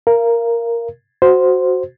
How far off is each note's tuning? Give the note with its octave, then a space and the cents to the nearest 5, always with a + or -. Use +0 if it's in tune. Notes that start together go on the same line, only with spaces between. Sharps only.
A#4 +0 F5 -30
F#4 +0 C5 +0